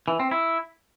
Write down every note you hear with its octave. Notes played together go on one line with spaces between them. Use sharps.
E3
C4
E4